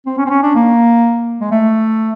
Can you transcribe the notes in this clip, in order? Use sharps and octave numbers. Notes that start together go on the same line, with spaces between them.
C4
C#4
C4
C#4
D4
A#3
G#3
A3